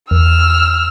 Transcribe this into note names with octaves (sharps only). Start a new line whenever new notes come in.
E2 E6 F6